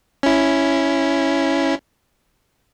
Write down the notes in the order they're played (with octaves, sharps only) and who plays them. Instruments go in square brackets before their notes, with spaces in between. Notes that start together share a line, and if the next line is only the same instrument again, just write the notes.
[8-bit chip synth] C#4 E4